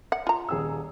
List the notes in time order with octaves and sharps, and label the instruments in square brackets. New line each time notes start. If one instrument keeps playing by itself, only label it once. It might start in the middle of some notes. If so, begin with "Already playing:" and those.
[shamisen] F#5
F4 A#5
[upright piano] D#1 G#4 E6